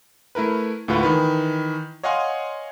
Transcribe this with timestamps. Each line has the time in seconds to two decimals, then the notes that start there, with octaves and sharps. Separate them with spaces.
0.35 A3 E4 A#4 B4
0.88 D2 A2 G#3 F4 B4 F#5
1.03 D#3 E3 B4
2.03 C#5 D#5 F5 F#5 G#5 C6